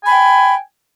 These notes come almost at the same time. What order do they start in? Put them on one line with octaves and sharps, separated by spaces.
G#5 B5 G5